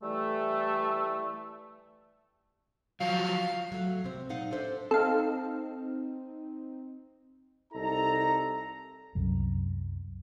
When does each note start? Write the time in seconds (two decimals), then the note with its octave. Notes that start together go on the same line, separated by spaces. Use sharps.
0.03 E3 G3 A3
3.00 F3 F#3 F5
3.72 F#3 A3
4.04 C3 C4
4.29 A#2 D#4 F5 F#5
4.51 D4 A4 C5 E5
4.91 C4 D#4 A4 F5
7.73 C2 D#4 A4 A#5
9.15 C2 F#2